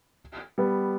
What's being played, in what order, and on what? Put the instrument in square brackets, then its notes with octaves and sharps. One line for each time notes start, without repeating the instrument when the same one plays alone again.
[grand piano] G3 B3